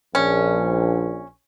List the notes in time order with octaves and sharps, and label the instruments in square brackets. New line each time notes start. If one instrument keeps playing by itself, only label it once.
[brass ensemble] A#1 [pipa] C#4